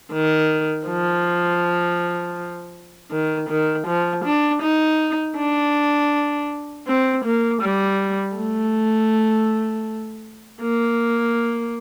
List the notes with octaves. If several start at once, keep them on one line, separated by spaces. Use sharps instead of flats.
D#3
F3
D#3
D#3
F3
D4
D#4
D4
C4
A#3
G3
A3
A#3